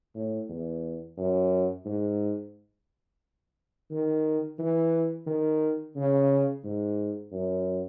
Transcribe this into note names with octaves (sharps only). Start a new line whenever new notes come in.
A2
E2
F#2
G#2
D#3
E3
D#3
C#3
G#2
F#2